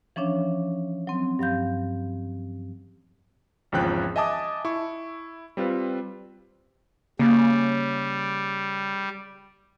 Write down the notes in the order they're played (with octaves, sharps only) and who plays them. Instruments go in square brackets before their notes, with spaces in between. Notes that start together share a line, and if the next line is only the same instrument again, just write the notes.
[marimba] E3 F3 C#4 D4 C#5
F#3 C4
G2 F#3 F5 G6
[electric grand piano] G#1 E2 C#3 F3 G5 F#6
D#5 E5 G#5 A5 D6 D#6
E4 C#6
G3 C4 F4 B4
[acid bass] C#3 [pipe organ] G3 [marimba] A#3